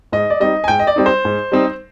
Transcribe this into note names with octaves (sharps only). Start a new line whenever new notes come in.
G#2 D#5
D5
G3 C4 D#4 D#5
G#5
G#2 G5
D#5
D5
G3 C4 D#4
C5
G#2
G3 C4 D#4